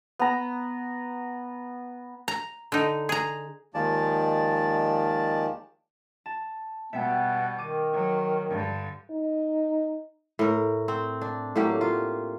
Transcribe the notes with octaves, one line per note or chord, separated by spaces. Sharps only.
B3 A#5
A#5
D3 D#4
G#4 A#5
D#2 D#3 F3 G#3 D5 A5
A5
B2 G3 B3 E5 G5
D#3 D6 D#7
F#3
G2 D3
D#4
A2 A#4
C4
D4
A2 F#3 A#3 G4
F4